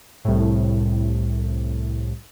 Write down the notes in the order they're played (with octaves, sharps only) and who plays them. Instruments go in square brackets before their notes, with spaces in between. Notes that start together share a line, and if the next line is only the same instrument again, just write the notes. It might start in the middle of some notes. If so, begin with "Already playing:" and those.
[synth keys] C2 A2